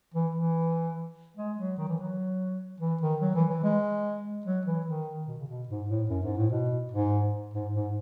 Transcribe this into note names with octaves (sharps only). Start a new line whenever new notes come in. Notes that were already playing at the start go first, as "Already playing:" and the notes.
E3
E3
G#3
F#3
D#3
E3
F#3
E3
D#3
F#3
E3
E3
G#3
F#3
E3
D#3
B2
C#3
B2
G#2
A2
F#2
G#2
A2
B2
G#2
G#2
G#2